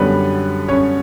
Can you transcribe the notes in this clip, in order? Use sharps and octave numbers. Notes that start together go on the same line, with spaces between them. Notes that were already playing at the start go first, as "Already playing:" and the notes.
Already playing: F#2 D3 G3 B3 B4
C#4 C#5